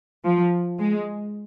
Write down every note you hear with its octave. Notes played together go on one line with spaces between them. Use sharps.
F3
G#3